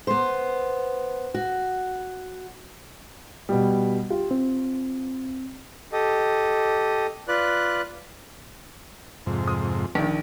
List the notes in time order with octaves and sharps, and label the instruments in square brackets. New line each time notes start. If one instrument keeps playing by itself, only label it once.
[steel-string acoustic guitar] B3 C5
F#4
[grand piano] B2 G3
[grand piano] F4 [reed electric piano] G4
[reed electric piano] C4
[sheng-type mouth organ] G4 A4 D#5
F4 B4 D5 F#6
[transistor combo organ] F2 G#2 C3
[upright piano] D#6
A#1 D#3